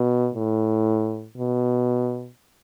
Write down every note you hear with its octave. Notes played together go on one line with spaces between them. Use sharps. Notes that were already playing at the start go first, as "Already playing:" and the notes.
Already playing: B2
A2
B2